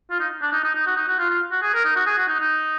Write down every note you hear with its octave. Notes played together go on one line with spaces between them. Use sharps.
F4
D#4
D4
D#4
D#4
D#4
F#4
D#4
F#4
F4
F4
F#4
G#4
A#4
D#4
F#4
G#4
F#4
D#4
D#4